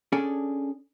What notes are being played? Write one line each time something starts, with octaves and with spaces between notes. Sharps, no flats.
C#4 D4 G#4 A4 D5